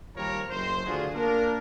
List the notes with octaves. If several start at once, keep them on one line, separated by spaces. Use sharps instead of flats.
D#2 F3 G3 A#4 C#5 A#5
F#1 C5
D2 D4 F4 F#4 G#4
A#3 D4 A#4